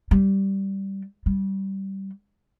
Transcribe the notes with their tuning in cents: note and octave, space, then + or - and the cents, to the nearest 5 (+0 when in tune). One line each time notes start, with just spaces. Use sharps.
G3 -10
G3 -15